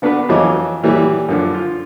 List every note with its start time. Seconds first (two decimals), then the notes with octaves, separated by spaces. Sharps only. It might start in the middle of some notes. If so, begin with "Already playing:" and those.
0.02 D3 B3 D4 F#4 B4
0.29 F2 E3 F#3 D#5 D6
0.83 A#2 E3 F#3 G3
1.29 F#2 D3 F3
1.54 F4